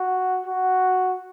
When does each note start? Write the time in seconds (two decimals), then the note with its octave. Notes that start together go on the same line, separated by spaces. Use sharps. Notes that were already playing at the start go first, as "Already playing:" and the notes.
Already playing: F#4
0.46 F#4